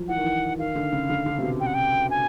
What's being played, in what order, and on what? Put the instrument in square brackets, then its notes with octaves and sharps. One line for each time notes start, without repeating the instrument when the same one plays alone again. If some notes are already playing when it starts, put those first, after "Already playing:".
Already playing: [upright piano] F3 F#3
[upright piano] E3 [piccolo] F#5
[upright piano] D#3
E3
[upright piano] D#3 [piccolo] F5
[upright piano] D3
C#3
D3
D3
C3
B2
[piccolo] G5
F#5
G5
G#5